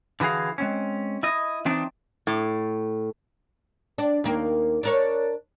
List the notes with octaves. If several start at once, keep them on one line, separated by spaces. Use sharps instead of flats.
D3 E3 F#4 G#4 F5
G#3 C4 C#4
E4 D#5
E3 C4 D4 D#4
A2
D4
D#2 A#3
D4 A#4 C#5